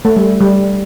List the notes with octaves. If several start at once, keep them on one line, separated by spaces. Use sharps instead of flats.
A3
G3
G3